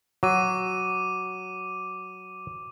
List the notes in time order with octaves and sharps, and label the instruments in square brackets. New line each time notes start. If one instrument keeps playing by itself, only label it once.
[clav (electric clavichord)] F#3 [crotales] D6 D#7